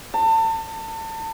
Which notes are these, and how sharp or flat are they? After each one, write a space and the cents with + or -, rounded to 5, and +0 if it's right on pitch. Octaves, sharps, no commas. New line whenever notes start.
A5 +35